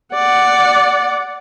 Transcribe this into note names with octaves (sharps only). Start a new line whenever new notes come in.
D5 F#5